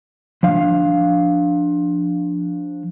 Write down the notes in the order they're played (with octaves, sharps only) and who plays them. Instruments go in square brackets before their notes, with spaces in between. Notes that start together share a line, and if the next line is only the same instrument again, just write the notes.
[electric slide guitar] F3 D4 F5